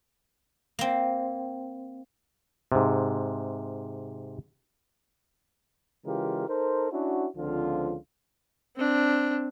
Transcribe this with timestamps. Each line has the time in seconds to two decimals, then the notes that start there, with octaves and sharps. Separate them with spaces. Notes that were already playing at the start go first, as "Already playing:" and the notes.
0.79 A#3 C4
2.72 G#2 C3
6.06 C#3 E3 G#3 F4 G4 A#4
6.48 D#4 A4 A#4 C5
6.92 C#4 D4 E4 F#4
7.37 C#2 D3 F3 C4 F4
8.77 C4 D4